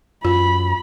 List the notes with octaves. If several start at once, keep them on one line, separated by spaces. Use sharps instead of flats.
F#2 F4 B5